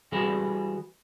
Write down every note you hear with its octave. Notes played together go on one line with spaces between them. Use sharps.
E3 G3 F#4 G#4 A4 B4